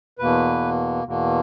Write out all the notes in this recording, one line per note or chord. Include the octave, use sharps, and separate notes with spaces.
E2 B2 A#3 B4
E2 B2 A#3